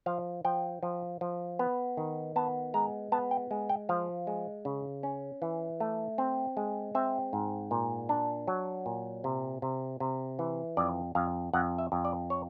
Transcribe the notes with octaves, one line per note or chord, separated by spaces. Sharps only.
F3 F5
F3 G5
F3
F3
B3
D#3
B3 A5
G#3 A#5
B3 A5
G5
G#3
G5
F3 F5
G#3
C#3
C#4
E3
A3
C4
G#3
C4 E5
G#2
A#2
D4
F#3
A#2
C3
C3
C3
E3
F2 D5
F2 F5
F2 F#5
E5
F2
D5
C#5